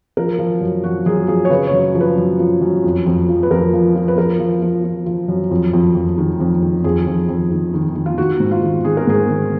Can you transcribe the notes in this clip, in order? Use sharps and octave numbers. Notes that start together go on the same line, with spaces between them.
F3 A#4
F3
F#2
F3 F#4
F#2 G#4
F3 G#4
C#5
C#3 B4
C#5
F#2
F3
B4
F#2
F3
F#2
F2
F2
F3
B4
F2 A#4
F3
F3
B4
F3 A#4
F3
F3
F3
F3
F#2
F2
F2
F2
D#3
F2
D#3
F2 G#4
F2
F2
D#3
D#3
D#3
F4
D#3 F#4
G#2
F4
D#3
D#3 G#4
A#4
G#2 G#4
D#3